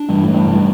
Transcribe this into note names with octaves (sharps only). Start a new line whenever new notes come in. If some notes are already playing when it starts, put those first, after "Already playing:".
Already playing: D4
G2 E3
A2
A3
G2
C3